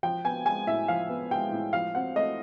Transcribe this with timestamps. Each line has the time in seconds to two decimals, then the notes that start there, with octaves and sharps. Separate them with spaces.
0.03 F3 G5
0.24 B3 G#5
0.45 G#3 G#5
0.67 A2 E5
0.88 F3 F5
1.09 B3
1.31 G#3 G5
1.52 A2
1.73 F3 F5
1.95 C4 F#5
2.16 A3 D#5